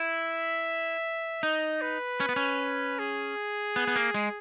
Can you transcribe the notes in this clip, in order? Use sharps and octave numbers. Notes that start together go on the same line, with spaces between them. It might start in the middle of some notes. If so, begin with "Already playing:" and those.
Already playing: E4 E5
D#4 D#5
B4
C#4
B3
C#4
G#4
B3
B3
A#3
G#3